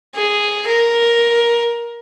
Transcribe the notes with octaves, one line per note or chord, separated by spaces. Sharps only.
G#4
A#4